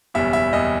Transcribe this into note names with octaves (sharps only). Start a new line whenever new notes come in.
F#1 E2 B2 G3 E5
E5
F#1 E2 B2 G3 D#5